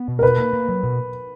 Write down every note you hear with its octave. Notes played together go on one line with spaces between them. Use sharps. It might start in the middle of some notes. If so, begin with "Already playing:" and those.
Already playing: B3
B2
A#4
B2 B4
A#3
A#3
F#3
B2